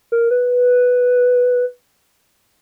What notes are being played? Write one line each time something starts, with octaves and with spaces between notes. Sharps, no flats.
A#4
B4